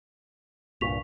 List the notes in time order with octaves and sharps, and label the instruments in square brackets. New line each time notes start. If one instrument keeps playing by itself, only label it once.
[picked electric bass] C2 G2 A#2 [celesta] C#6 B6 F7